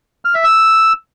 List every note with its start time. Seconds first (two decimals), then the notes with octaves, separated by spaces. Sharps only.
0.25 F6
0.34 E5
0.44 E6